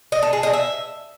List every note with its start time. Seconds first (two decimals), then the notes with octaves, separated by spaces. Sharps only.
0.12 D#5
0.23 A4
0.33 G#4
0.43 D#5
0.54 E5